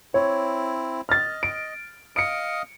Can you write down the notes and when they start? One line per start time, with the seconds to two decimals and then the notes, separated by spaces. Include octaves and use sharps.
0.14 C4 E4 C#5
1.09 D#5 F6 A6
1.43 D7
2.16 D#5 F5 D#6 C#7 D7